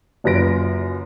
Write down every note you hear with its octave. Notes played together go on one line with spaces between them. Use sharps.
F#1 F#2 F4 B4 A#6 D7